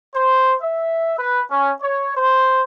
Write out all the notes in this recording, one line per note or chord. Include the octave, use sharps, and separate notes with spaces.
C5
E5
B4
C#4
C#5
C5